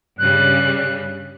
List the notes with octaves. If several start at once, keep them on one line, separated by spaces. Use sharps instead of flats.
G2 C#3 G3 F#6